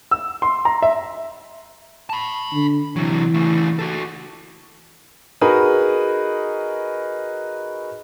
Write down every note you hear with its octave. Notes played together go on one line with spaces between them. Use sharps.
E6
C6
A#5
E5
A5 B5
D3
C3 E3 F#3
C#3 A3
F#4 A4
D#4 F#4 G#4 A#4 B4